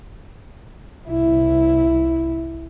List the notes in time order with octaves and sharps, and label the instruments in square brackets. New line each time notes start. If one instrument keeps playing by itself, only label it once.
[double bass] C2 E4